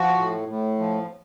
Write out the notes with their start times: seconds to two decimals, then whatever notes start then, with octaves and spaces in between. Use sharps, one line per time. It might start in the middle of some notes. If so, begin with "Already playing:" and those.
Already playing: F3 F#4
0.17 A2
0.48 A2
0.79 F3